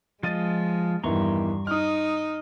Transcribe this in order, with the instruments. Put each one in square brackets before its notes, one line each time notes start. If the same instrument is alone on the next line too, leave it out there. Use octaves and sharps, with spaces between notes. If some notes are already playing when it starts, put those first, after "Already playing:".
[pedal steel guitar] F3 F4 D#5 [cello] G#3 [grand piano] A6 D#7
[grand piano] E2 D#3 E3 [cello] G2 [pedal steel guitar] A#5 C6 C#6
[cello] D#4 [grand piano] D#6 F6